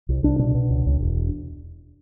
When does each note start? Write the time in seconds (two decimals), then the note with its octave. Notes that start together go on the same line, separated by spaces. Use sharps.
0.09 C2
0.23 C2 D4
0.39 B2 D4
0.55 B2
0.70 C#2
0.86 C#2
1.01 E1